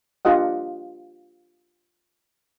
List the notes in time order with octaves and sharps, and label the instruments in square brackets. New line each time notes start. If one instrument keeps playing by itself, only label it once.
[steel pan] D4 F4 G4 D#5 F#5